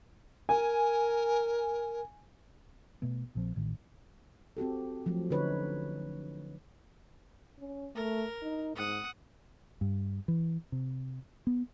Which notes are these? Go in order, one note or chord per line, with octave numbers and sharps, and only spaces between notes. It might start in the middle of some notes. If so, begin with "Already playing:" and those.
A#4 G#5
B2 A3 B3
A#1 A#2 F3 C4
A1 A2 D#3
C4 F#4 G4 A4
F3 F#3 A3
D3 C#4 D#4 B4 C#5
C#4
A3 A#4
D#4
G#2 F#5 D#6
G2
E3
C3
B3